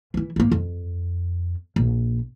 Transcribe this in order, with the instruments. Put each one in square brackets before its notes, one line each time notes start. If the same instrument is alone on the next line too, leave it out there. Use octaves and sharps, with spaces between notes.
[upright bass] E3 E4
G#1 A#3
F2
A#1